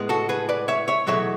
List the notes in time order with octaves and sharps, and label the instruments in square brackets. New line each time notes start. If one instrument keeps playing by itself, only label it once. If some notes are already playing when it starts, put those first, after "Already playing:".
Already playing: [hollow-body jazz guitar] A2 G#3 B3
F#4 A4
G#4 B4
B4 D5
C#5 E5
C#5 E5
E2 B2 F#3 A3 C#5 E5